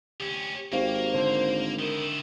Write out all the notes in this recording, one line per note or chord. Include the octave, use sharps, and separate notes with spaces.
D2 C#4 G4
G#1 A#3 F#4 G4 C5 F5
D3 C5
D#3 E4 A#4